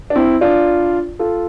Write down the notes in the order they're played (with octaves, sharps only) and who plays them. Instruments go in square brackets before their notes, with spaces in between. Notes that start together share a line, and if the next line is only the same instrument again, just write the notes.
[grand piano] D4
C4 E4
D4 F4
F4 A4